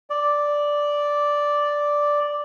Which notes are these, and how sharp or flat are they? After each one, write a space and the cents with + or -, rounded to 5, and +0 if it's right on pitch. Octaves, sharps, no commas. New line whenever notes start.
D5 -5